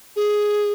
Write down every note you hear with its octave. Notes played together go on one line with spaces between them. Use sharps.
G#4